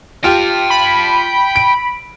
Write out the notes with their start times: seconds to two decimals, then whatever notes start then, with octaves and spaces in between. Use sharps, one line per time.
0.24 F4 G4 G5 A5
0.70 B5
1.56 D7